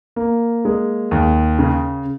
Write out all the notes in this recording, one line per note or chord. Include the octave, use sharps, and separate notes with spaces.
A#3
G#3
D#2
C#3